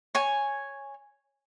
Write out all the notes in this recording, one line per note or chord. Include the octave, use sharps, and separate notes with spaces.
C#5 G#5